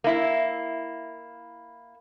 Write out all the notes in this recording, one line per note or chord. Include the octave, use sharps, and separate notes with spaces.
A#3 E4